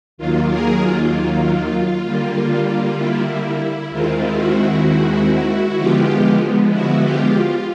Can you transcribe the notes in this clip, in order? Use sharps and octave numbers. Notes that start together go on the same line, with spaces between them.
D#2 D#3 F#3 A#3 F4
G#4 A#4
F4
D3 G3 A#3
E4
D#2 D#3 G#3 C4 E4 F4
E4 F#4
D3 F3 G#3 B3 F4 G4
E4 F#4
F4 G4
F4